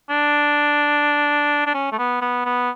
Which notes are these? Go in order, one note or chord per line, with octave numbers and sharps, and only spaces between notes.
D4
D4
C#4
A3
B3
B3
B3